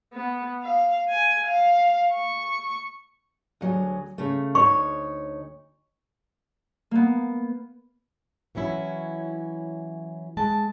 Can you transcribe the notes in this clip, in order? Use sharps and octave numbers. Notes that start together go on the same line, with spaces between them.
B3
F5
G#5
F5
C#6
D2 F#3 G#4
C#3 A3
D2 D#4 C#5 C#6
A#3 B3
E3 F#3 C#4 E4
G#3 A5